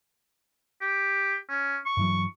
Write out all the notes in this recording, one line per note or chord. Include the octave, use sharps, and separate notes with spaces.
G4
C#4
C#6
G2 E3 F#3